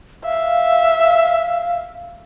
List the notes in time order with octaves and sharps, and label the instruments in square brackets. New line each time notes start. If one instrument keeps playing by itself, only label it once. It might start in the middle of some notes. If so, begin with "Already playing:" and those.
[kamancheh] E5 [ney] F5